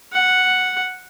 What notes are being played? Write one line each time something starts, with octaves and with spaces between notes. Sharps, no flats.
F#5